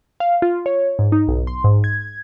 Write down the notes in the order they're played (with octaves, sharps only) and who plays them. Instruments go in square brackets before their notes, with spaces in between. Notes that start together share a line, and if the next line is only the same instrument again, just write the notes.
[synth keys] F5
F4
C#5
G#2
D#4
B1
C6
G#2
G#6